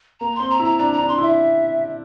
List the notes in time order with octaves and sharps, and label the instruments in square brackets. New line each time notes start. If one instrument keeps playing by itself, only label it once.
[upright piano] A#3 [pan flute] A#5
[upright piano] C4 [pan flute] C6
[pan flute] A#5
[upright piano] E4
[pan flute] A#5
[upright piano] D4 [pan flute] A#5
[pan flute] A#5
[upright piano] D4
[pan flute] C6
[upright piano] E4
[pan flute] E5